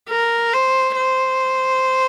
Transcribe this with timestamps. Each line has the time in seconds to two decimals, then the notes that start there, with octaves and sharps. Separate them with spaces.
0.09 A#4
0.53 C5
0.96 C5